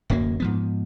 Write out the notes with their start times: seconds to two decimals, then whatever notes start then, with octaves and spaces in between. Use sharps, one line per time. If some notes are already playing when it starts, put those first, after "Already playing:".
0.10 D1 F#2 F#3 A#3
0.40 G#2 F3 B3